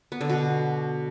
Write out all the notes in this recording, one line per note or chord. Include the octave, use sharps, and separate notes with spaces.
B3
D3
B2